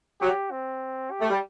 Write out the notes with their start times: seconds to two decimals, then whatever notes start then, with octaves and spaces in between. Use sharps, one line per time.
0.21 F#3 G4
0.51 C4
1.11 G4
1.21 A3
1.30 G3